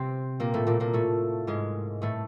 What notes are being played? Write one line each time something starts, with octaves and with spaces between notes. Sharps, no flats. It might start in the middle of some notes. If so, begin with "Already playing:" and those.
Already playing: C3 C4
A#2 A#3
A2 A3
A#2 A#3
A#2 A#3
A2 A3
G#2 G#3
A2 A3